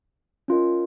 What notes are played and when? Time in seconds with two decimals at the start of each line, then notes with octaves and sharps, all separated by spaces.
0.48 C#4 F4 A#4 D#5